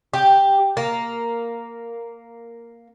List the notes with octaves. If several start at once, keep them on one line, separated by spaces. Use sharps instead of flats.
G4
A#3